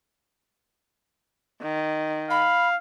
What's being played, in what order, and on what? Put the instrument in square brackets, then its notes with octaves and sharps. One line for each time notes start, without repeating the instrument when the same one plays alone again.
[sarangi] D#3
[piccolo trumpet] F5 [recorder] B5